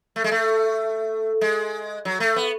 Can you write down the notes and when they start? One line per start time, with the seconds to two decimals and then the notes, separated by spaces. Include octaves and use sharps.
0.16 A3
0.24 G#3
0.32 A3
1.41 G#3
2.05 F#3
2.20 A3
2.36 B3